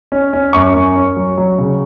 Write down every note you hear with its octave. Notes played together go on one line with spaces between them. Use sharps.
C#4
C#4
F#2 C#6
F#2
C#4
F#3
F#3
C#3